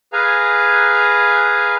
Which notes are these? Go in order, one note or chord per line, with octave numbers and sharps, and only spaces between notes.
G#4 B4 F5 G#5 A#5